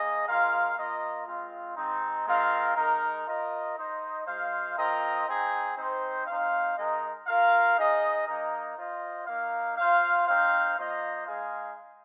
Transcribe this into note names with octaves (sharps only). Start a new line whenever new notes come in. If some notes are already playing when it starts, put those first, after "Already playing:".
Already playing: A#3 G#4 D#5
G#3 F4 A#4 F5
A#3 F4 A#4 D#5
G#3 C4 F4
G#3 C4 D#4
G#3 C4 F4 A#4 F5
G#3 D#4 A#4
F4 A#4 D#5
D#4 C5 D#5
G#3 F4 C5 F5
C4 F4 A#4 D#5
C4 D#4 G#4
C4 D#4 C5
C4 D#4 C5 F5
G#3 D#4 A#4 D#5
F4 A#4 F5
D#4 G#4 D#5
A#3 D#4 A#4 D#5
F4 C5 D#5
A#3 D#4 A#4 F5
F4 C5 F5
C4 D#4 C5 F5
A#3 F4 C5 D#5
G#3 D#4 G#4 F5